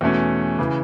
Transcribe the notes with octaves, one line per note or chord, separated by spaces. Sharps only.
E2 B2 A3 C#4
C#3 E3